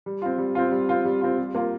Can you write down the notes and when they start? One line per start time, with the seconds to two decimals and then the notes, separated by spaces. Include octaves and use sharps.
0.06 G3
0.22 C4 F4
0.38 G3
0.55 C4 F4
0.71 G3
0.89 C4 F4
1.05 G3
1.21 C4 F4
1.38 G3
1.55 A#3 F4